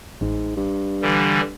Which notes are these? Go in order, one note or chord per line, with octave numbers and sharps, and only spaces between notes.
A1 G#2
G2
D3 E3 G3